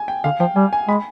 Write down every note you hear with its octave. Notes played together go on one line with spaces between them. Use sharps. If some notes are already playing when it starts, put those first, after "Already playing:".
Already playing: G#5
G5
D3 F5
F3 G5
G3 G#5
G#5
G#3 B5